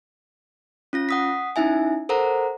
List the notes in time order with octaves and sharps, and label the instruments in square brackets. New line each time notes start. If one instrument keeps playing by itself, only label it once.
[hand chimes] C#4 F4 A#6
F#5 D#6 B6
C#4 D#4 E4 E5 G#5
A4 A#4 C5 F#5 A#5